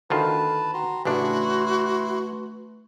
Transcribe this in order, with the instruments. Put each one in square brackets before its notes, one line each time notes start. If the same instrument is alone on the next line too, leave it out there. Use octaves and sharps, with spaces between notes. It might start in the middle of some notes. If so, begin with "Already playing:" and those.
[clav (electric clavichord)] D2 D#3 F4 [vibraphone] A4 [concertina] B4 A5
[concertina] F#4 A#5 C6 [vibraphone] G5
[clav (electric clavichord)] A1 C#3 D4 [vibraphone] A3 B4 [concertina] E4 C6 [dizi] F#4